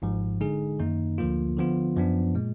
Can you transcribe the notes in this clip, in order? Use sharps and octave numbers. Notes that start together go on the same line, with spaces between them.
G#1 G#2 F3
D3 G#3 D#4 G#4
F#2 D#3 A#3 D#4
D2 D3 F3 A#3 F4
D3 F3 B3 F4
F#2 F3 B3 D4
A#2 G#3